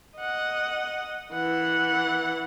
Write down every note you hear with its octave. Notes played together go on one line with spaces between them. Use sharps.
D#5 F#5
E3 F#5